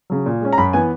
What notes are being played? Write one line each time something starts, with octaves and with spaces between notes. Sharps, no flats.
C#3 F#3
A#2
G#3 C#4
A#5
F#2 B5
E3 B3 G#5